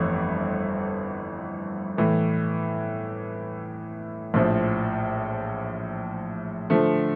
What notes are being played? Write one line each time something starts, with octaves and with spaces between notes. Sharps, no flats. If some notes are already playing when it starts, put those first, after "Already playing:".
Already playing: G1 F2 E3 A3
A2 E3 A3
A#1 A2 F3
D3 F3 A3